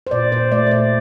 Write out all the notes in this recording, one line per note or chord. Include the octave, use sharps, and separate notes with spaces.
C5
A#2 D5
A#2 C5
A3 D5
C5
A#2 D5